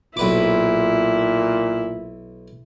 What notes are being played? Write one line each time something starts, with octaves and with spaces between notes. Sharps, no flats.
B1 A#2 E4 B4 D6